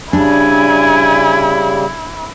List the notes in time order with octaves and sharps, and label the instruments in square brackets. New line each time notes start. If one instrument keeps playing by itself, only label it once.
[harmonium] C#3 G3 [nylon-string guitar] D4 [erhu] E4 [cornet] G#5